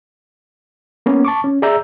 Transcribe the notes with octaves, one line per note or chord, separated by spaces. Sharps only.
A#3 B3 C#4
A5 C#6 D6
C#4
G#4 D5 E5 A#5 E6 G6